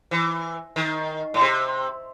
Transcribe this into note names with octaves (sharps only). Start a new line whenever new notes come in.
E3
D#3
A2
C3